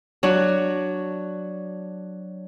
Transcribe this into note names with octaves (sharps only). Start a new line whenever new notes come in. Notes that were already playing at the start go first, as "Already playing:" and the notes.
F#3 D4 F#4